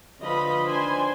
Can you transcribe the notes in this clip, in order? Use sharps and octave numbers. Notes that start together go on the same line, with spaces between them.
D3 F3 F4 B4 D#5 B5
D#3 D4 C5 G#5 C6